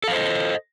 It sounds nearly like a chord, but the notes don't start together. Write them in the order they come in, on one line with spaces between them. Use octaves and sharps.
A4 F5 C5 D#5